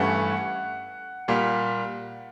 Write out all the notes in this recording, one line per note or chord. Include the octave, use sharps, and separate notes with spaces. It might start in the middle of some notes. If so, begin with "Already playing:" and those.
Already playing: G2 E3 A3 C#4 F#5
A#2 G3 A#3